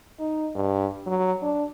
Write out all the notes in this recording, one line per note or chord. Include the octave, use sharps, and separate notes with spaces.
D#4
G2
F#3
D4